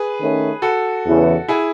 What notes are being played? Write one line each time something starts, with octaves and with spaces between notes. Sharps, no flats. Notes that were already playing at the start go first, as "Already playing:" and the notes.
Already playing: G#4 B4
D#3 A3 C#4
F#4 A4
E2 C#3 E3
E4 G#4